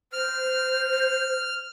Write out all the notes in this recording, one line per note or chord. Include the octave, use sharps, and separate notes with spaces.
C5 F6